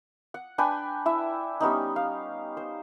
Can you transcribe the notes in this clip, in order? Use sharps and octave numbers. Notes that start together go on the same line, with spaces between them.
F#5
D4 B4 G5 G#5
E4 E5
G3 B3 C#4 D#4
F5
C5